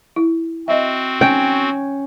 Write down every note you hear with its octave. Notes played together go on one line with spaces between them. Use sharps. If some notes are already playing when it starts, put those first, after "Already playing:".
E4
C4 F#4 D#5 E5
C#4 G5